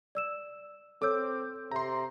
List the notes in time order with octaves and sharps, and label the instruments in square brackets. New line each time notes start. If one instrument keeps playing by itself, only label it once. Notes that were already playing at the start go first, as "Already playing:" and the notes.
[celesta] D5 E6 E7
[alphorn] C4 [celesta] A4 C#5 E6 [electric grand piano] D6 G6
[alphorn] C3 [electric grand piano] A#5 C6